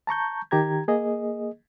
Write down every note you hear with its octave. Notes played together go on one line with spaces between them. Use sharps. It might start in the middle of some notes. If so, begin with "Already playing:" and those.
A5 A#5 C#6 G6
D#3 G4 A#5 G#6
A#3 G#4 D#5